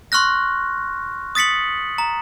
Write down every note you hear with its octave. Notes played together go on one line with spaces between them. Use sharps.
C6 C#6 F6 F#6 A#6
D#6 A6 B6 C#7 F#7
A#5